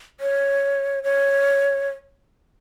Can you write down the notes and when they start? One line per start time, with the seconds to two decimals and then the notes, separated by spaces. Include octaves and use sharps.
0.20 C#5
1.04 C#5